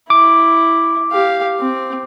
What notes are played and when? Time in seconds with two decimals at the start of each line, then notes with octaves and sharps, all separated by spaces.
0.10 E4 D6
1.12 G4 F5
1.60 C4